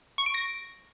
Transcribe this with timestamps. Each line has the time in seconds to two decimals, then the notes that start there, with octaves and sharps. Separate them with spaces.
0.18 C#6
0.26 D7
0.34 A#6